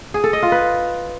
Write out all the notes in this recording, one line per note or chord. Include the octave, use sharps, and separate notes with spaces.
G#4
A4
D#5
F4
B4